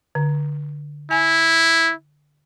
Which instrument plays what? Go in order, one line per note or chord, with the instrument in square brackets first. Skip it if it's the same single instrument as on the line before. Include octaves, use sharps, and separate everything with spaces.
[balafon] D3
[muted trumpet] E4 [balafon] G#5